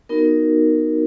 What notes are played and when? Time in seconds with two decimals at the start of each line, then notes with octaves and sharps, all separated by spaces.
0.09 B3 D#4 F#4 A#4